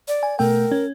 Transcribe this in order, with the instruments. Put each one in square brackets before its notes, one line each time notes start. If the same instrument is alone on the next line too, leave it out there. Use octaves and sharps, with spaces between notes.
[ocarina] D5
[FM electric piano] G#5
[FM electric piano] B2 A3 G5 [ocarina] A#4
[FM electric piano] C#4